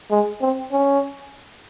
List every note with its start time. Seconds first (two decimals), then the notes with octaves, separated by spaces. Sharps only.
0.11 G#3
0.41 C4
0.72 C#4